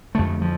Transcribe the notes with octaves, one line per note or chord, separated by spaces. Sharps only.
F2 D3 A3
F3